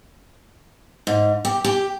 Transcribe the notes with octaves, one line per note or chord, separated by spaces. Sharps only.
G#2
G4
G4